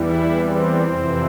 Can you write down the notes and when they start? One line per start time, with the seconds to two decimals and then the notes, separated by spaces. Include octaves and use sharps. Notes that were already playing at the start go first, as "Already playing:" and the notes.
Already playing: E2 E3 G3 E4
0.39 C4
0.86 F2 C3 E3